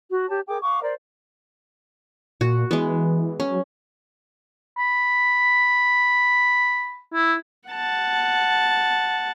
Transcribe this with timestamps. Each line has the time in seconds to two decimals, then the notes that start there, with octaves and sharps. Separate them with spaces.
0.08 F#4
0.28 G4 C#5 A5
0.48 G#4 A#4 G5 D6
0.61 F5 F#5 C#6 D6
0.82 A#4 C5 D5
2.41 A#2 F#4
2.71 E3 G#3 B3
3.40 F#3 C#4
4.78 B5
7.14 E4
7.69 F#5 A5